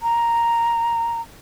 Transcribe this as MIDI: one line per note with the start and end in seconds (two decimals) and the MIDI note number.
0.02 1.21 82